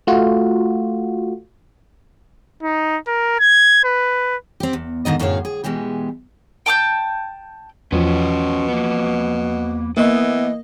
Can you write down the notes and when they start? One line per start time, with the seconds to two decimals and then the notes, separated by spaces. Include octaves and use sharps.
0.07 A3 F4 F#4
2.63 D#4
3.08 A#4
3.40 G#6
3.84 B4
4.60 C4 G4
4.73 E2
5.05 G#2 D3 D#3 D#5
5.19 F#2 A2 D3 G#4 C#5 F5
5.45 G#4
5.64 B2 E3 G#3 G4
6.66 G5 A5 D#6 G6
7.92 E2 B2 F3 C#4 B4 C#5
8.68 A#3 B3
9.97 E3 A#3 B3 D#5